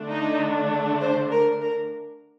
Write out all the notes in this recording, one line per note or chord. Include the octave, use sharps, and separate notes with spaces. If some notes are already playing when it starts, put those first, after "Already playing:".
Already playing: D3 A3 D4
D#4
C5
A#4
A#4